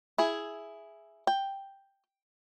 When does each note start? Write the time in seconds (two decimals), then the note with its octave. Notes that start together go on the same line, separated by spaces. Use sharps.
0.18 E4 G#4
1.27 G5